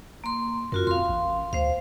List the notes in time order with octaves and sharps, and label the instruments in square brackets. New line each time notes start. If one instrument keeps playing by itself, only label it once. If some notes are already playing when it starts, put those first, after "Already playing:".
[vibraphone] A#3 C6
[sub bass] F#2 [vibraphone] F4 F#4 A#4
[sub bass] F2 [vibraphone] F5 C6
[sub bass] A1
[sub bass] D2 [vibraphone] C5 F5